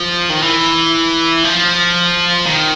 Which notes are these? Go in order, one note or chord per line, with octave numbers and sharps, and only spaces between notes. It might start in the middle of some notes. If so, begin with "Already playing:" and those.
Already playing: F3
D#3
E3
F3
D#3